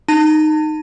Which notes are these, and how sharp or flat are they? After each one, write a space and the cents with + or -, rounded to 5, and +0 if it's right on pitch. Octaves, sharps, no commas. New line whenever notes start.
D#4 -10 A5 +35